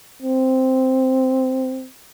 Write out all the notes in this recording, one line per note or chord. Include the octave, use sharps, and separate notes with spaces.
C4